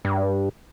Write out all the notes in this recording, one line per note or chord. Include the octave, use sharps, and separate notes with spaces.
G2